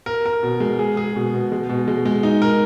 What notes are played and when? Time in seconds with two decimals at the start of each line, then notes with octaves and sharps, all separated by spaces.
0.06 A#4
0.25 A#4
0.43 B2
0.60 G#3
0.79 G#4
0.97 G#4
1.16 B2
1.34 B2
1.52 G#3
1.69 B2
1.88 G#3
2.05 G#3
2.23 D#4
2.42 A#4